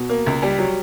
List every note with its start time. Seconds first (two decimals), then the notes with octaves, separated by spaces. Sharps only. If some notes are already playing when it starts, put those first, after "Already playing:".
Already playing: B2
0.09 A#3
0.27 C#2
0.42 G3
0.58 F#3